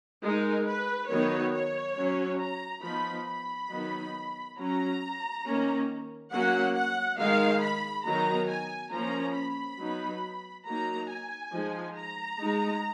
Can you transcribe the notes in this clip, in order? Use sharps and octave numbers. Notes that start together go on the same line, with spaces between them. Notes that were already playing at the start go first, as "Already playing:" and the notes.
G#3 D#4 A#4
B4
D#3 F#3 B3 D#4 C#5
C#5
F#3 C#4
A#5
F3 B3 D#4 B5
B5
D#3 F#3 B3 D#4
F#3 C#4 A#5
D#3 A#3 C#4
F#3 A#3 C#4 F#5
F#5
D#3 G#3 D#4 F5
B5
D#3 F#3 B3 D#4 A#5
G#5
F3 A#3 C#4 A#5
B5
F#3 B3 D#4
F#3 A#3 D#4 A#5
G#5
F3 G#3 D#4
A#5
G#3 D#4